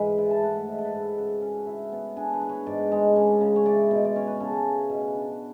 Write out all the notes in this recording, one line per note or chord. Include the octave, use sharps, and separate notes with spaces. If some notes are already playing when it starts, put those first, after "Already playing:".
Already playing: G#2 E3 G#3 B4
E4 D5
A5
A3 F#5
F#5
G#2
A4
B4
G#2
A4
C#3 F#4
C#4
E4
B3
D4 G#4
B4
D4
C#5
G#2 D5
G#3
C#4
C#3
C#5
E4 D5
B2
D5
C#4 C#5
B4
C#3 A4
G#4
C#4
B2
D4
F#4